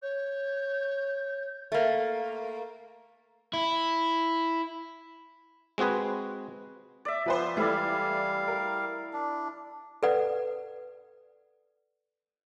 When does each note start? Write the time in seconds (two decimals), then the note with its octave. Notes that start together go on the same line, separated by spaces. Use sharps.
0.02 C#5 G6
1.72 A3 A#3
3.54 E4
5.78 G#3 C4 F#4 G#4 B4
7.05 D5 E5
7.26 F3 B3 B4 C5
7.57 E3 G3 A3 E4 D5 F5
8.48 A#4
9.13 D4
10.03 A4 B4 D5 F#5